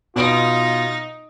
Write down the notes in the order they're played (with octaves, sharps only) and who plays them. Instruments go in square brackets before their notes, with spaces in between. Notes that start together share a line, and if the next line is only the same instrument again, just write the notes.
[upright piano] B2 D7 [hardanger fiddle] D#4 [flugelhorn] F4